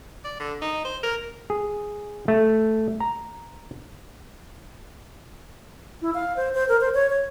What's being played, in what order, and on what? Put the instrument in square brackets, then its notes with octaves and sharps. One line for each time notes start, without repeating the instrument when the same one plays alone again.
[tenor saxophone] D5
D3
D#4
C5
A#4
[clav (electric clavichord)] G#4
A3
A#5
[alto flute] E4
F5
C5
C5
A#4
C5
C#5
C#5